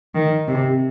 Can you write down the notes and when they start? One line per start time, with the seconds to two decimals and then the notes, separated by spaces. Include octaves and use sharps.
0.15 D#3
0.48 C3